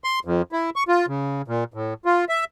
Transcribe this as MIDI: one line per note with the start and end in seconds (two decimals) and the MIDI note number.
0.04 0.19 84
0.25 0.42 41
0.52 0.70 64
0.76 0.83 85
0.88 1.06 65
1.08 1.42 49
1.48 1.64 46
1.74 1.94 45
2.05 2.25 65
2.29 2.45 76